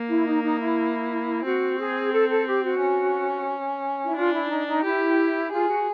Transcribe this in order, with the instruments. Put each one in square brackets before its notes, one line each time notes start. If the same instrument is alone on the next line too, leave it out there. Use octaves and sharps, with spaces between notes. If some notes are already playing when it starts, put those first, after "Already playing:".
Already playing: [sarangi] A#3
[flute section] E4
D#4
D#4
E4
[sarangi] C4 [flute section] F#4
[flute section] G#4
A4
A4
G4
F#4
[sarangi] C#4
[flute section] E4
[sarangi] D4 [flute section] F4
[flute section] E4
D#4
D#4
[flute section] E4 [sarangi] G4
[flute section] F4 [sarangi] G#4
[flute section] F#4